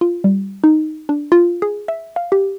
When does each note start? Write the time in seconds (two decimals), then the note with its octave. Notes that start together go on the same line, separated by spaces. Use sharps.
0.01 F4
0.24 G3
0.64 D#4
1.09 D4
1.32 F4
1.62 G#4
1.88 E5
2.16 F5
2.32 G4